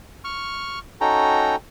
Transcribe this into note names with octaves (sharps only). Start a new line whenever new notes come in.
C#6 F6
C#4 D#4 F#4 A4 G5 A#5